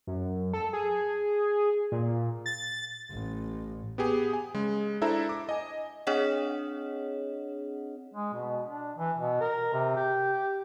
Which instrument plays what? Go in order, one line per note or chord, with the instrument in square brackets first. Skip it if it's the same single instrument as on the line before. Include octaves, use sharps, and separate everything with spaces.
[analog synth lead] F#2
A4
G#4
A#2
A6
[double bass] A1
[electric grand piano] B3 G4 G#4
G#5
C#3 G#3
D4 E4 A4 C5 E5 A#5
D6
D#5 G#5
[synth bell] C4 D4 G#4 C#5 D#5 F#5
[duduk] G#3
B2
D4
E3
B2
A#4
C3
G4